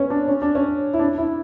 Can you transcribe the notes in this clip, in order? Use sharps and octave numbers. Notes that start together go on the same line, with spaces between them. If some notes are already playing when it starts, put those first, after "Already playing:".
Already playing: B3 C#4
D4
C#4
D4
C#4
E4
D4
E4